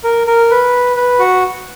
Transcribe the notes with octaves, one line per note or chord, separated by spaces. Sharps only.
A#4
A#4
B4
B4
F#4